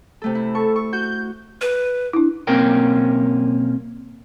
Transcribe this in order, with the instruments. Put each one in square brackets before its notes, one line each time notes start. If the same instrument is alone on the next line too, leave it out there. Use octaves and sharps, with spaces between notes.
[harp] C3 A3 A4
E4
[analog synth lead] A4 [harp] C#6
[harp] C#6
[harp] F#4 [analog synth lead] G6
[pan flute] B4
[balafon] D4 E4
[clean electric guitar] B1 A#3 C4 C#4 A#4 G5